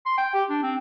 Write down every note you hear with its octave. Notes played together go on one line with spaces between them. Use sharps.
C6
G5
G4
D4
C4